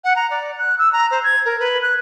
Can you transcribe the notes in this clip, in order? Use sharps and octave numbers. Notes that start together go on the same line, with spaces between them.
F#5
A#5
D5
F#6
E6
A#5
C5
G#6
A#4
B4
F#6